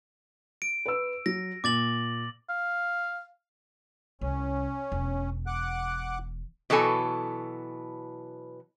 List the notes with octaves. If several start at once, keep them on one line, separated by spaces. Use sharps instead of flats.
D7
B4 E6
F#3 A#6
A#2 D6 A6 F#7
F5
C2 C#4
E1 E2
F#5 D6 F#6
B2 E3 F#3 A4 G#5